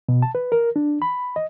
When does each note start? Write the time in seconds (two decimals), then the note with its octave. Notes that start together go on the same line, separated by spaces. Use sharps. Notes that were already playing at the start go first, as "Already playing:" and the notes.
0.09 B2
0.22 A5
0.35 B4
0.52 A#4
0.76 D4
1.02 B5
1.36 D#5